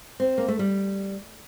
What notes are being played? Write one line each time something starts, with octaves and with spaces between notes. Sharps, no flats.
C4
A#3
A3
G3